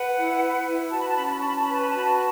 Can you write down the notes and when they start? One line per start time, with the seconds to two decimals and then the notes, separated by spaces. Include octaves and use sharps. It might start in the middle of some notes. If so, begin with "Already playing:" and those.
Already playing: B4 F#5
0.16 E4
0.41 B4
0.66 E4
0.91 F#4 A5
0.99 B5
1.08 A5
1.16 C#4 B5
1.25 A5
1.31 B5
1.40 A5
1.43 C#4 B5
1.56 A5
1.63 B5
1.68 B4 A5
1.80 B5
1.88 A5
1.94 F#4 B5
2.04 A5